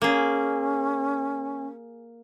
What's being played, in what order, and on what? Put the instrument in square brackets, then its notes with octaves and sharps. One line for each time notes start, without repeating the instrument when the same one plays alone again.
[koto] A#3 G#4 [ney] C#4